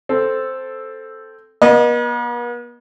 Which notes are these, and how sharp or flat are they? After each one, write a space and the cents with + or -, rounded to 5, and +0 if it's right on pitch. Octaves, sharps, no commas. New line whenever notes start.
C4 +0 A4 +0
B3 -45 D#5 -20